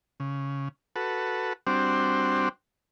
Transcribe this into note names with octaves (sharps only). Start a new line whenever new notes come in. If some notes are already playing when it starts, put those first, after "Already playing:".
C#3
F#4 A4 B4
G3 C4 D4 F#4 C5 G5